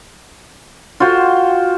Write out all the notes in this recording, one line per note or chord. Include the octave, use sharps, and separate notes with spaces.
F4 F#4 C5 G5